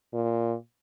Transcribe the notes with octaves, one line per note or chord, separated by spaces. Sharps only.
A#2